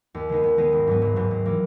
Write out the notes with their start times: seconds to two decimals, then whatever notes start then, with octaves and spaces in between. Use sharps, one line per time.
0.14 D#2
0.29 D#3 G#3 B3 D#4
0.43 D#2
0.58 D#3 G#3 B3 D#4
0.73 G#1
0.87 G#2 F#3 B3
1.02 G#1
1.16 G#2 F#3 B3
1.31 G#1
1.46 E3 A#3